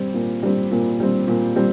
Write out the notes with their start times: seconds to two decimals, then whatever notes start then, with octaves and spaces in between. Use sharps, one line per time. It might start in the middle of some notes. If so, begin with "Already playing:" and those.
Already playing: G3 C4
0.14 A#2
0.43 G3 C4
0.71 A#2
1.00 G3 C4
1.28 A#2
1.56 G3 C4